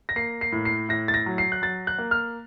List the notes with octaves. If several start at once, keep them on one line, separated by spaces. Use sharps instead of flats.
A#6
A#3 C7
C7
A2
C7
A2 A#6
A6
A#6
F#3
C7
F#6
F#3 A6
F#6
A#3
F6